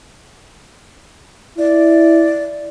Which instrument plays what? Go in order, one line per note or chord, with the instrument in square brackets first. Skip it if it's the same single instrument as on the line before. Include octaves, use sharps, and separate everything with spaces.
[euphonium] E4 [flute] D5